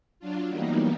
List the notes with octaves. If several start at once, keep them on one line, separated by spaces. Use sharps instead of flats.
F#3 D4 F4
E3 F#3 G3 A#3 B3 D#4